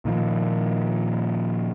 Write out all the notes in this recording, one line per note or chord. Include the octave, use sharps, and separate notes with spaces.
A#2 D#3 F3